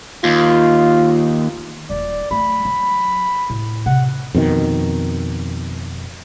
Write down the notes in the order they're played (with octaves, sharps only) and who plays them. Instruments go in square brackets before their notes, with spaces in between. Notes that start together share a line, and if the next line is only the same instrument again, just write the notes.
[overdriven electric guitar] D#2 [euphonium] F4
[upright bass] D#1 [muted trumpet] D5
[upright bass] F#3 A3 [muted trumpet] B5
[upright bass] F#3
A2
[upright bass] C3 [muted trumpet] F#5
[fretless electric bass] F2 B2 D#3